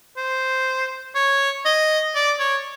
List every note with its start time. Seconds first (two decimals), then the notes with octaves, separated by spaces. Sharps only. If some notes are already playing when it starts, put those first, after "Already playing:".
0.17 C5
1.15 C#5
1.65 D#5
2.15 D5
2.39 C#5